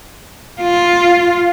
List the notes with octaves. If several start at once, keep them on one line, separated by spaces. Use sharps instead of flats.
F4